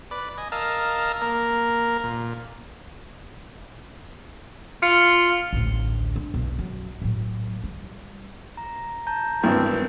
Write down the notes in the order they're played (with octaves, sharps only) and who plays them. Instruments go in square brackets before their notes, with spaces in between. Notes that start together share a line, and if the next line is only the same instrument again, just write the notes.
[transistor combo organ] B4 D5
D#5 G#5
A#4 D#5 F5 A5 E6
A#3 A#4
A#2
[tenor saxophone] F4 [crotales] F6 C#7 F7
[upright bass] A1 D2
D4
B1 F#3
F#2
A2 F#3
G3
[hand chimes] A#5
A5 A#5 G6
[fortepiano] G#1 G2 E3 [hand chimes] B3 A#4 G6 [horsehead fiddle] C4